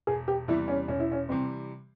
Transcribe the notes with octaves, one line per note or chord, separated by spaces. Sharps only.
E1 G#4
G4
E2 C3 E3 G3 E4
C#4
E1 C#4
E4
C#4
C3 E3 G3 C4